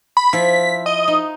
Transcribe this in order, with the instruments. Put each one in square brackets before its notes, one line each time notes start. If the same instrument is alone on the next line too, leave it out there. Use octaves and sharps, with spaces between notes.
[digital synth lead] B5
[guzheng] F3 E4 F4 [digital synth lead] B6
[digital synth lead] D#5
[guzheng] D#4